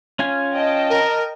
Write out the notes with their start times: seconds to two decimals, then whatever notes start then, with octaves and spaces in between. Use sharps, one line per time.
0.19 C#4 F4 G#5
0.53 D#5 G5 A5
0.90 A#4